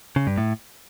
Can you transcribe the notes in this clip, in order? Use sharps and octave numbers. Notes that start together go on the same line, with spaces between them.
C#3
G2
A2